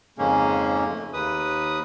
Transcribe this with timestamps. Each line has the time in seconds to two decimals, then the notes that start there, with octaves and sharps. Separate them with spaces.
0.18 F2 G#2 C#3 G#3 A#3 C#4
0.89 A3
1.13 D#2 B4 D#6